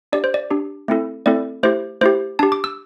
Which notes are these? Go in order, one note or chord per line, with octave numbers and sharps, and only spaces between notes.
D4 G4 D5
C5
D5
D4 G4
A3 C4 E4 A4
A3 C4 E4 A4 D5
A3 E4 G4 C5
A3 E4 G4 C5
D4 G4 A5
D6
E6